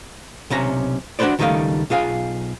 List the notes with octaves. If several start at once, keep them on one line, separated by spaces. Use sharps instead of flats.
B1 C3 C#4 A#5
D4 F#4 G4 B4 C5 D5
C#2 D#3 G3 A3 D#5 F5
B1 F4 G#4 F5